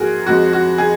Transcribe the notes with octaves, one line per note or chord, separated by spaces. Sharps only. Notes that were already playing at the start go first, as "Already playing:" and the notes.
Already playing: G#2 F3 A#3 F#4 G#4 A#4
F2 F3 G#3 F#4
F#4
G#4